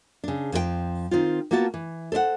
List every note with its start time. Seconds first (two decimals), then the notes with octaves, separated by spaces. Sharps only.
0.24 C#3 D4
0.52 F2 F3 G#4 G5
1.11 D#3 C4 F4
1.51 A#3 B3 F4 F#4 D5 A5
1.74 E3
2.12 A4 C5 D5 F#5